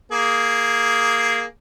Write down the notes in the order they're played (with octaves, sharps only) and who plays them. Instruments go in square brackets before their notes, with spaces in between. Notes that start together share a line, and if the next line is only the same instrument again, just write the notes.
[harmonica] A#3 G#4